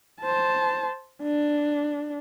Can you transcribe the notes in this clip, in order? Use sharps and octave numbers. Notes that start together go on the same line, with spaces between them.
C5 A5
D4